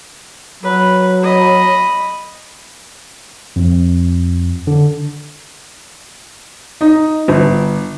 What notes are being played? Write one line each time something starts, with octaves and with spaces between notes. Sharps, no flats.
F#3 B4
D#5 B5
F2
D3
D#4
G1